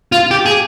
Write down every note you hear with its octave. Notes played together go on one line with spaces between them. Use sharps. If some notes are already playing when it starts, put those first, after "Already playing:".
F4
G4
G#4